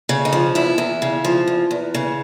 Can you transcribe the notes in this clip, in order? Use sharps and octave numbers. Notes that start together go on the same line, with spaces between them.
C#3
D#4
F3
E2 E4
E2
C#3
F3
E2
E2
C#3